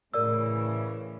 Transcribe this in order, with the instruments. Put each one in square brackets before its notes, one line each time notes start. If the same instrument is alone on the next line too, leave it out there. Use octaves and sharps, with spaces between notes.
[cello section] A2 C#3 E3 [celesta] A#4 D5 E6